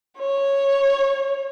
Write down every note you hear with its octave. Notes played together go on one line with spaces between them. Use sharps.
C#5